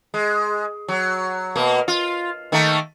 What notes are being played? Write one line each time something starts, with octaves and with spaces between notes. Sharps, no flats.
G#3
F#3
B2 A#3
F4
D#3 A3 A#3